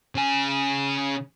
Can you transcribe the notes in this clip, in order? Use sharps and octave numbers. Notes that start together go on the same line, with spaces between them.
C#3 G#5